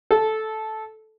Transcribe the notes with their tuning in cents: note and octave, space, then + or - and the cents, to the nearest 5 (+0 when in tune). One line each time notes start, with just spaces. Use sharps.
A4 -10